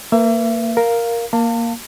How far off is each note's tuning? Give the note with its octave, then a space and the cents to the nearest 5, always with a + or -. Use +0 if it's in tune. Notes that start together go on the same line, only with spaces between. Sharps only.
A#3 -20 B4 +0 E5 +35
A#4 +0 F5 +0
A#3 +0 F5 +0 A5 +40